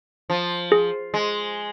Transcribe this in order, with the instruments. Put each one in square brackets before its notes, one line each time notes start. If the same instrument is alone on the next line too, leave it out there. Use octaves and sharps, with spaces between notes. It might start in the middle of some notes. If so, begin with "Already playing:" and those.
[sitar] F3
[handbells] G#4
[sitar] G#3